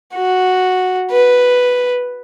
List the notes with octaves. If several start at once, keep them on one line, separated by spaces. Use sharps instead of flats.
F#4
B4